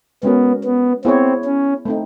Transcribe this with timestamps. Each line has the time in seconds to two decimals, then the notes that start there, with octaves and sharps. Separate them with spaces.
0.23 G#3 B3 C#4 F#4 A#4
0.64 B3
1.04 B3 C4 E4 G#4 C#5
1.45 C#4
1.85 A3 C4 D#4